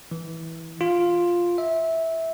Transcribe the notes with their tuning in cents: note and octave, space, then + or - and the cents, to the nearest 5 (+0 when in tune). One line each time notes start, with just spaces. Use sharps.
E3 -15
F4 +0
E5 -15